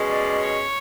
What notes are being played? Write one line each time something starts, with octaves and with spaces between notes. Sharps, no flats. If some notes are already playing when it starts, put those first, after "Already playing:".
Already playing: B2 G#3 C#4
D5
C#5